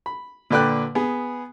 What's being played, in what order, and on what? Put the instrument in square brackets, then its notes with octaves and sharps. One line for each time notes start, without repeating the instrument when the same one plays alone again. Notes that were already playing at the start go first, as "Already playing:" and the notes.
[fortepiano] B5
A#2 D3 B4 D5 G5 F#6
B3 G#4